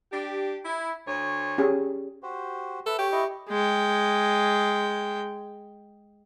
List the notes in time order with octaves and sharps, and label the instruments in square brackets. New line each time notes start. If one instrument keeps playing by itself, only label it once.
[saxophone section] D4 G4
E4
D2 C#5
[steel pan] C#4 G4 G#4
[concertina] F#4 G4 C5
[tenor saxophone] A4 [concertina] B4 E5
[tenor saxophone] G4 [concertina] C#5
[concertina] E4 D#5 C#6
[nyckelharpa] G#3 G5